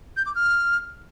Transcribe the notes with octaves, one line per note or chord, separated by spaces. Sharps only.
G6
D6
F6